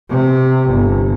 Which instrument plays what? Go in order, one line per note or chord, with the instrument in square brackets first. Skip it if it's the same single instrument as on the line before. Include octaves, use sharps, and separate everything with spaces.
[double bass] C3
G1